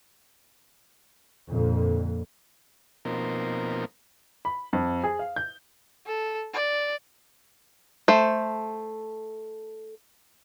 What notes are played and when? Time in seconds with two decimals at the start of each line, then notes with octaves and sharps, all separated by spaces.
1.51 F2 A#2 D3
3.05 B2 F3 A#3 C4 D#4 A#4
4.45 B5
4.73 F2
5.04 G#4
5.19 F5
5.36 G6
6.07 A4
6.53 D5
8.08 A3 C5